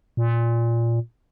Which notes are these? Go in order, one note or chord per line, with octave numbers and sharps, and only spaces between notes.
A#2